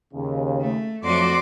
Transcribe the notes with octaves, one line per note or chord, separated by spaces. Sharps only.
D#2 C#3
A3
F2 F3 F#3 A3 F#4 D5 C6 D6